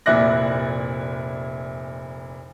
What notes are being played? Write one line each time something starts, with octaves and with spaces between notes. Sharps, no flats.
F1 A#2 E4 D5 F#6 A#6